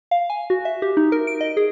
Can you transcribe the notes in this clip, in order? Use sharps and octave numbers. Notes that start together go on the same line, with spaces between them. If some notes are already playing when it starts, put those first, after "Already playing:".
F5
G#5
F#4
E5
G4
D#4
A#4
D7
D#5
G#4